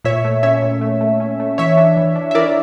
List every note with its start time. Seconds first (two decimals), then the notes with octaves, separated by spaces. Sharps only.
0.05 A#2 C#5 E5
0.25 A3
0.43 C#4 C#5 E5
0.62 A#2
0.81 A3
1.01 A3
1.20 C#4
1.40 A3
1.58 E3 C#5 E5
1.77 D4
1.97 E3
2.16 D4
2.31 E5
2.35 E3 A#4 D5